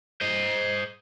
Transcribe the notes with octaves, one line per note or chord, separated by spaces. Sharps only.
C5 D#5